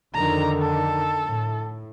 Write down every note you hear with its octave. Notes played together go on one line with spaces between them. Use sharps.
F2 D3 D#3 A#5
A4
A2